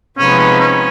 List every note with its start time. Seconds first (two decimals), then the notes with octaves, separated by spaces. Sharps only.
0.18 C3 F3 G#3 B3 C#4 D#4
0.39 C#4
0.60 C#4